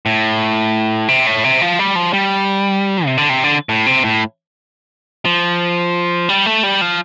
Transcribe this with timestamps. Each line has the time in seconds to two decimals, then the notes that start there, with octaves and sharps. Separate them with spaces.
0.06 A2
1.08 C3
1.27 A2
1.44 C3
1.61 F3
1.79 G3
1.96 F3
2.13 G3
3.05 C3
3.17 D3
3.29 C3
3.44 D3
3.69 A2
3.86 C3
4.04 A2
5.25 F3
6.29 G3
6.46 A3
6.63 G3
6.81 F3